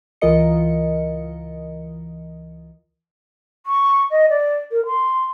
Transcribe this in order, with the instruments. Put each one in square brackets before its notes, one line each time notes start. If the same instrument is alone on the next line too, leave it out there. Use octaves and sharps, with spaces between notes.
[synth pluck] C#2 E3 F4 A#4 D#5 C#7
[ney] C#6
D#5
D5
A#4
C6